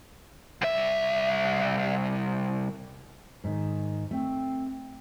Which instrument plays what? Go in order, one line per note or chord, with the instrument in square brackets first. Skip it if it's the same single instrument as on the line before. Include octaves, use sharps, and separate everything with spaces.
[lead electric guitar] C2 E5
[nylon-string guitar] G#2 D#3
[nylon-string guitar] A3 [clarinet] C4